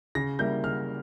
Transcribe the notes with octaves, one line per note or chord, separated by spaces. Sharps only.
C#3 A#6
G3 A#3 E4 G6
C#3 F6